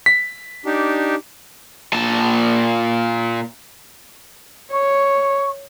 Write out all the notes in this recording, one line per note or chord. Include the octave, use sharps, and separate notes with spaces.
B6
D4 D#4 G4
A#2 A5
C#5 C#6